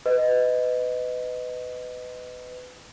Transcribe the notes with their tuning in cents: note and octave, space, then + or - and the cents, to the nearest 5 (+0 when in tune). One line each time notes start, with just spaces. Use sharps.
B4 +25 D#5 +0